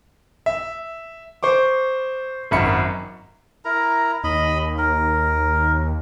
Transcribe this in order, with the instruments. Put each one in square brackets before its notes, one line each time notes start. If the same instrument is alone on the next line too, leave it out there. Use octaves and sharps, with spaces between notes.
[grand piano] E5
C5 C#6 D6
G#1 F#2 E5 B5 C#7
[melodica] E4 A#4 A#5
[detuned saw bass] D#2 [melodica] D#5 B5
[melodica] A#4